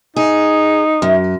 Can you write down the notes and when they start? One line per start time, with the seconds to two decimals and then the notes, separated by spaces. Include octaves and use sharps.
0.16 D#4 G#4
1.02 F#2